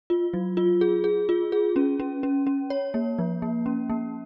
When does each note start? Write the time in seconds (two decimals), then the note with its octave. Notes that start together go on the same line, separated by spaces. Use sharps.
0.10 F4
0.34 F#3
0.57 F4
0.81 G#4
1.04 G#4
1.29 F4
1.52 G#4
1.76 C#4
2.00 C#4
2.23 C#4
2.47 C#4
2.70 C#5
2.94 A#3
3.19 F3
3.42 A#3
3.66 C#4
3.90 A#3